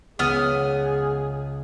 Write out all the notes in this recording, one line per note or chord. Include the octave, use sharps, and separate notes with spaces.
C#2 B3 G#4 D#6 F6